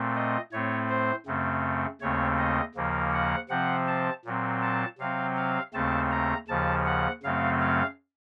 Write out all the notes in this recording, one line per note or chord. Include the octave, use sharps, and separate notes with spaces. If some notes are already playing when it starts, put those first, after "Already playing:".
Already playing: A#2 A3 C4
D#5
A2 A3 C4 C#5
C5
F#2 C#3 A3 C4
D#2 C#3 A3 C4 C#5
D#5
D#2 C#3 F3 A#3
F#5
C3 F3 C4 F#5
A5
A#2 F#3 C4
A5
C3 F#3 C4 F5
F5
D#2 C#3 A3 C4 A5
A#5
D#2 C#3 F3 A5
F#5
F#2 C#3 F#3 A3 C4 F5
F5